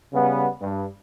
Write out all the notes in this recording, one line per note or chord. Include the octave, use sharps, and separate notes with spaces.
C#3 G3 B3
G2